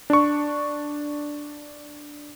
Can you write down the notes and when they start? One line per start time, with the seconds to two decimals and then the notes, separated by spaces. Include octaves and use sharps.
0.10 D4 C#6